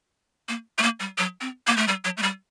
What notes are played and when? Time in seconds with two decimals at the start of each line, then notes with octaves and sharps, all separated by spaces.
0.48 A#3
0.78 A3
0.83 A#3
1.00 G3
1.18 F#3
1.41 C4
1.67 A#3
1.77 A3
1.88 G3
2.04 F#3
2.17 A3
2.22 G3